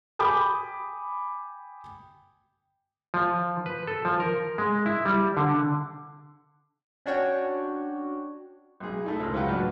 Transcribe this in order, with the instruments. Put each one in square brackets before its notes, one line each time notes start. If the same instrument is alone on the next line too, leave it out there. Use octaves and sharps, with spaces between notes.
[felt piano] G5 G#5 B5 D6 D#6 G6
[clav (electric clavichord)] F3
B4
A4
F3
A#4
G#3
E4
G3
D3
[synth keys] C#4 D4 F#4 C#5 G5
[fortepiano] B1 G#4
A3 D#4 E4
C#2 F3 G#3 A#4 C5
C#2 F#3 F4 F#4 B4 G5
F#2 A2 D4 F#4 B4 F6